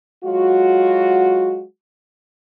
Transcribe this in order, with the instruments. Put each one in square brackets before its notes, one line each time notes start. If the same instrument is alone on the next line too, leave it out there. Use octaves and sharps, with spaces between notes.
[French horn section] F#3 G#3 F4 F#4